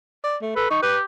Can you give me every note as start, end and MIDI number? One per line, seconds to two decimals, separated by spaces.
0.24 0.37 74
0.42 0.56 57
0.56 0.70 69
0.56 0.70 71
0.71 0.80 63
0.71 0.78 85
0.82 1.03 67
0.82 0.97 71